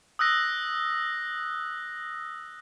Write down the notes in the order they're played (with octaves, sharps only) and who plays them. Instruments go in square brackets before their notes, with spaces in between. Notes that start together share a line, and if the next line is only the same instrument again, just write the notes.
[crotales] D#6 E6 F#6 A#6